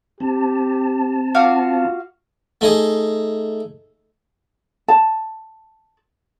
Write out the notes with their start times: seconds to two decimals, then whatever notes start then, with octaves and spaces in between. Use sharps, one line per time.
0.20 C4 G4 A5
1.35 F4 F#4 F5 D6
2.61 A3 D#4 G#4
4.88 A5